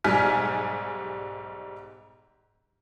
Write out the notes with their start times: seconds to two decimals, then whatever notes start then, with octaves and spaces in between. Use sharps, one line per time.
0.04 B1 G#2 G3 G#5 F6 B6